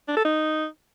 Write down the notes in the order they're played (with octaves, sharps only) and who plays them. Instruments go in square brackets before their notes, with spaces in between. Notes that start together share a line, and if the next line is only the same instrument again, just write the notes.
[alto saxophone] D4
A4
D#4